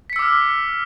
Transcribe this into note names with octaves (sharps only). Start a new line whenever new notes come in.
D6 E6 F6 B6 C#7